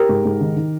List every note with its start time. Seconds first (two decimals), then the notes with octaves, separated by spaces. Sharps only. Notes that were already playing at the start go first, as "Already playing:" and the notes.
Already playing: G4 A#4
0.09 G#2
0.25 G#2
0.41 D#3
0.56 D#3